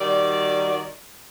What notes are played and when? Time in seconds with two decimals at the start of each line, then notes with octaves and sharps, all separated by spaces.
0.01 D#3 G3 F#4 D5